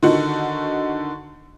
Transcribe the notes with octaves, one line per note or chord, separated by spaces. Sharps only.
D3 D#3 D#4 F#4